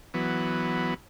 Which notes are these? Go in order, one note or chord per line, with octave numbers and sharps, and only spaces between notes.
E3 F#3 B3